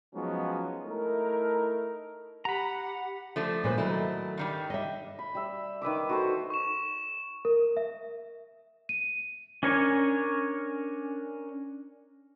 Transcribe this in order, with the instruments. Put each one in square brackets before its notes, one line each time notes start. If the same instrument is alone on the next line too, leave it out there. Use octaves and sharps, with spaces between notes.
[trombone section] F3 F#3 G#3 B3 C#4 D#4
A3 D#4 E4 A#4
[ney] G4 [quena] F#5 [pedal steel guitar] A#5 B5
[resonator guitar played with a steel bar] F3 A3 D4
[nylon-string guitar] A#2 B4 C5
[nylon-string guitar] D#3 F#3 [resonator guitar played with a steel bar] A3 E4
[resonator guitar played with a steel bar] G2 D#3 G3
[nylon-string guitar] D#5 E5
[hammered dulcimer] B5
G3 E5
D#3 B4 E5 D6
F#4 A4 C5
[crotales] C#6 E7
[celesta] A#4
E5
D#7
[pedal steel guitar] C#4 D4 A#4 C#5 G#5